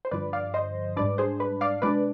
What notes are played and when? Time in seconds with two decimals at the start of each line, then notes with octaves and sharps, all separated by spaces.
0.05 C5
0.11 G2 D3 F3 B4 D5
0.33 D5 F5
0.54 C5 D#5
0.97 G#2 G3 D4 B4 D5
1.18 G#4 C5
1.40 B4
1.61 D5 F5
1.82 B2 G#3 D4 B4 D5